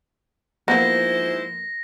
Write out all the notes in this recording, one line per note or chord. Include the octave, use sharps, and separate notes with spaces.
G#2 F3 A#3 B3 E4 C5 A#6